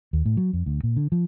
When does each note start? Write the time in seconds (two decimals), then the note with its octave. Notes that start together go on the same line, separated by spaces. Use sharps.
0.13 D#2
0.25 A2
0.37 F#3
0.53 F2
0.66 D2
0.83 A#2
0.96 D3
1.12 F3